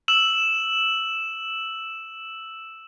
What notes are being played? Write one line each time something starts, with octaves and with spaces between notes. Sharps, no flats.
E6 E7 F#7